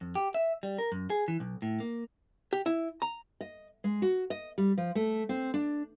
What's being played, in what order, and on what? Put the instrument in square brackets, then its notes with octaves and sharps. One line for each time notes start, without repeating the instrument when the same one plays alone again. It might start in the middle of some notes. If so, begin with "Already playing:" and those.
[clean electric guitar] F2
G4
E5
G3
A#4
F#2
G#4
E3
B1
A2
A#3
[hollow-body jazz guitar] G4
E4
A#5
[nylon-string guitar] D#5
G#3
F#4
D#5
G3
F3
A3
C4
D4